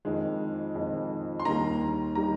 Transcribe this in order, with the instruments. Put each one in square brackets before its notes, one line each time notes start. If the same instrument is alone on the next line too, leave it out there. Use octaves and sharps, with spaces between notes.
[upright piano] F2 D#3 G#3
F2 D#3 G#3
C6
D#2 D#3 G3 A#5
D#3 G3 A#5